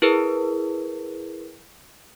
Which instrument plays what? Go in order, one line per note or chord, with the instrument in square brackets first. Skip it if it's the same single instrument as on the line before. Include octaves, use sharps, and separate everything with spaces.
[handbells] E4 G#4 A#4 B4